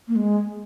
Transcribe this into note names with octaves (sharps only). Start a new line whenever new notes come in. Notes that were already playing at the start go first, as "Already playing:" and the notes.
A#3
G#3